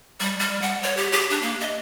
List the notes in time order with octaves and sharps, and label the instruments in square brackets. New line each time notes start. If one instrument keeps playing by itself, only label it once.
[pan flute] G3
G3
F#5
C#5
G4
G4
D4
A#3
D#5